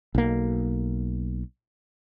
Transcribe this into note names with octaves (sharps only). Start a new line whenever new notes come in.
B1 A#3